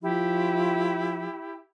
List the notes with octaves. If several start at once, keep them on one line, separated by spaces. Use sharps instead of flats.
F3 E4 G4